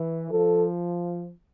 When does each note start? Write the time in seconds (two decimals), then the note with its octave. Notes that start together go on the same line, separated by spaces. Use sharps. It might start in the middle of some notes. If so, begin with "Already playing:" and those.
Already playing: E3
0.31 F3 A4